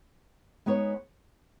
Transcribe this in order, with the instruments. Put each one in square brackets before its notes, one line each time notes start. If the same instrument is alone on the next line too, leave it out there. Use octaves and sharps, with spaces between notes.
[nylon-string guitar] G#3 B3 D#4 G#4 C#5